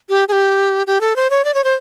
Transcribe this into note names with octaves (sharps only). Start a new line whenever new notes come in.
G4
G#4
G4
G4
A4
C5
C#5
D5
C#5
C5